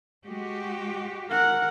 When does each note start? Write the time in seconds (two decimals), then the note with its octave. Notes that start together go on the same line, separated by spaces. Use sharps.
0.25 G#3 F#4 G4
1.30 A#4 F#5